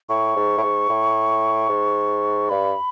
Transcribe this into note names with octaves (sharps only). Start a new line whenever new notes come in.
A2 C#6
G#2
A2
G#2
A2
G#2
G2 B5